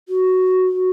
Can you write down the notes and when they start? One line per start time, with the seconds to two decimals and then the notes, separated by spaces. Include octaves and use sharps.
0.08 F#4